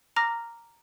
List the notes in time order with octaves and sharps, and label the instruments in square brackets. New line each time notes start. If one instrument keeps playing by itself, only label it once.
[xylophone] A#5 D6 F6 A#6